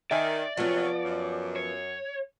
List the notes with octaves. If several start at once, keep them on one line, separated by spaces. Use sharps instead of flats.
D#3 D5 E5 G#5
C3 F3 F#3 B3 C#4
F#2
C#5